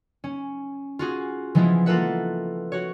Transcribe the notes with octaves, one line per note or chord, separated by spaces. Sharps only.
C#4
F4 F#4 G#4
E3 F3 G#3 B3 E4 F4
A#3 F4 A4 B4 E5 F#5
F#4 C#5